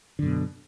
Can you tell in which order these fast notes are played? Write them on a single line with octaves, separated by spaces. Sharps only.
D3 F#2 B2